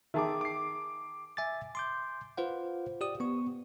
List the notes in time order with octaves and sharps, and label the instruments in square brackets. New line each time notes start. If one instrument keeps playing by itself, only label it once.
[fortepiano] D#3 G#4 [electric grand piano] E5 A5 D6
[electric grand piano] D6 C7
[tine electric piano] E5 G#5 D6 A6
C6 D6 G6
F4 B4 C5 F5 F#5
G4 D5 D#6
B3 C#6